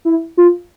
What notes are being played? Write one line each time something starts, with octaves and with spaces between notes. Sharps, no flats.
E4
F4